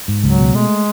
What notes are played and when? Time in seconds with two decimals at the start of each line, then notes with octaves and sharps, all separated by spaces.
0.08 G#2
0.24 C#2 F#3
0.39 B2
0.55 G#3 A3